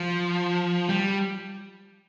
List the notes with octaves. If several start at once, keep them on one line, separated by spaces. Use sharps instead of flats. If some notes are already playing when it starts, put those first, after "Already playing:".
Already playing: F3
G3